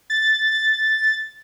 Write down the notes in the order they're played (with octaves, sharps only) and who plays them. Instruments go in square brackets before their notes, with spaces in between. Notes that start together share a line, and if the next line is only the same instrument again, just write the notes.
[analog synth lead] A6